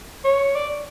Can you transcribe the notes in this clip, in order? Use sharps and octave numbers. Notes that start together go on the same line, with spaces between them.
C#5
D5